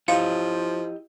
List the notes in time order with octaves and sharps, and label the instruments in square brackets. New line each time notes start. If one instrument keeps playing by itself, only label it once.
[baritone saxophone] F3 [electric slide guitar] E4 G4 D#5 [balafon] F5